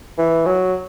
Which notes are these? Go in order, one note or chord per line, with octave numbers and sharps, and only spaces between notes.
E3
F#3